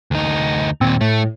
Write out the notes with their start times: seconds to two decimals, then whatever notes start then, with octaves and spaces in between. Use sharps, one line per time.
0.11 D2 D#4
0.81 D#2 A#2 C4
1.01 A2 A3